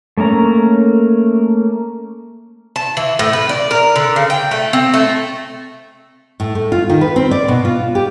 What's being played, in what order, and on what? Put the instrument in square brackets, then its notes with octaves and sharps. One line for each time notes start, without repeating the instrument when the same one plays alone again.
[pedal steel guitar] A3 A#3 C#4 A#5
[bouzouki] A5
E3
A2
B4
D5
A#4
D3
C#3
G5
A3
C4
A3
[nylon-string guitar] A2
A3
F4
D#3
B4
C4
D5
B2
F4
G4